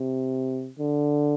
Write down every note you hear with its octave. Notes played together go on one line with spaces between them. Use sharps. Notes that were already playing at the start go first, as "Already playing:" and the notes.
Already playing: C3
D3